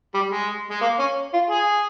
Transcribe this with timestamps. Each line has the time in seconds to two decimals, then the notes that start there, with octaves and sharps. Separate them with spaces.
0.14 G3
0.31 G#3
0.71 G#3
0.82 A#3
0.99 C#4
1.33 F4
1.50 G#4